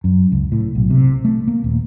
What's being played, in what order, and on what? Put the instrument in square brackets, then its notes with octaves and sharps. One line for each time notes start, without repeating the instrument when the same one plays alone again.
[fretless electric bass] F#2
C#2
A2
B1
C3
A3
A#3
D#1